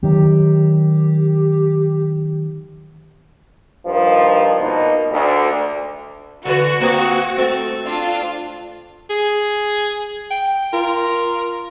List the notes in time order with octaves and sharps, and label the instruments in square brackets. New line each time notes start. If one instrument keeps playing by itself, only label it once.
[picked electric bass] D#3 F#3 [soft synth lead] G4
[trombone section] G2 D#3 F3
B2 A#3 D#4
D2
[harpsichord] D3 E3 [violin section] F#4
[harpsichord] A#3 C4 G#4
A3 C4
[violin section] D4 F4
[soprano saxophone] G#4
G5
[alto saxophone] F4 [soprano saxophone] A#4